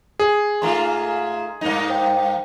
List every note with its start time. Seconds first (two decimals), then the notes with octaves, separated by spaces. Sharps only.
0.20 G#4
0.62 G#2 A3 F4 A#5 C6
1.61 G2 A#3 D#4
1.90 C5 G5